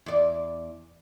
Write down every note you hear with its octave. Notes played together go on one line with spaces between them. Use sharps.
E2 D5